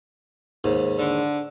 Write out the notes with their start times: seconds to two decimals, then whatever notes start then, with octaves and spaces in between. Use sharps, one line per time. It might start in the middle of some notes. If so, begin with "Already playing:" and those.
0.64 D#2 G#2
0.99 D3